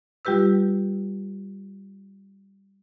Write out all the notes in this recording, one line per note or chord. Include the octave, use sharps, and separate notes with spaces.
G3 F4 G4 B4 E6